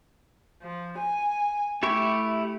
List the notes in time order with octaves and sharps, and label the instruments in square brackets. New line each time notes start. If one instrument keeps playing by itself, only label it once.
[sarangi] F3
G#5
[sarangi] A3 [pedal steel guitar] E4 G4 C#6